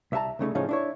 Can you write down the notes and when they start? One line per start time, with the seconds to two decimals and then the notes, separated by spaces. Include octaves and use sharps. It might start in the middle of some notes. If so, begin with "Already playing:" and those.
0.12 C2 E5 F#5 A5 A#5
0.39 C2 C#3 A3 D#4
0.55 A2 C#3 F3 G#3 C#4 D#4
0.69 D4 E4 C#5